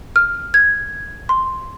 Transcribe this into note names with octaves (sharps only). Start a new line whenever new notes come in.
F6
G#6
C6